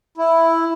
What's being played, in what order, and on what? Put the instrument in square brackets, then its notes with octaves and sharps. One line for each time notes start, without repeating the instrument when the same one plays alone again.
[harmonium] E4